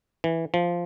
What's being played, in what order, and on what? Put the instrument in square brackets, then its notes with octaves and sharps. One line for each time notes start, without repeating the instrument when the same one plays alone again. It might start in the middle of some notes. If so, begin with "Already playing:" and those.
[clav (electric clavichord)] E3
F3